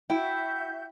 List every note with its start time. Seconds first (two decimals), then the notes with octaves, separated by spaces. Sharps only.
0.10 E4 F#4 E5 G5 G6